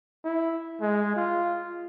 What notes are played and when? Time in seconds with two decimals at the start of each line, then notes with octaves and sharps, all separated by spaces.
0.24 E4
0.81 G#3
1.16 F4